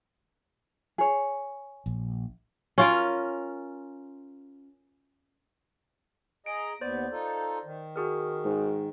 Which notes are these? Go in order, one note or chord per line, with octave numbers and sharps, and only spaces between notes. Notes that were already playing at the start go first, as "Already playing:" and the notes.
G#4 C#5
A#1
C#4 F4 A#4
G#4 D#5 A#5 D7
D#2 B3 C5 D5
D#4 F4 A4
D#3
F#4 G#4 A#4
G#2